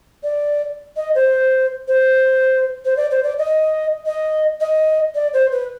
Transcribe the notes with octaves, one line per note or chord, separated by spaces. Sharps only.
D5
D#5
C5
C5
C5
D5
C5
D5
D#5
D#5
D#5
D5
C5
B4